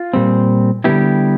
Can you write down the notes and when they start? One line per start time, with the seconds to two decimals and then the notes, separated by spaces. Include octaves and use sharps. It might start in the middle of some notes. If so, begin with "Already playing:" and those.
Already playing: F4
0.13 A#2 G3 C4
0.84 D3 G3 B3 E4 G4